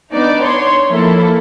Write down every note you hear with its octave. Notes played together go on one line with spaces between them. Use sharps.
B3 D4 D#4 D5
C#5 C6
F3 A#3 E4 A4